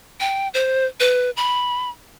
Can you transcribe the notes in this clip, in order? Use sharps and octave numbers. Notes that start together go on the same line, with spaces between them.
G5
C5
B4
B5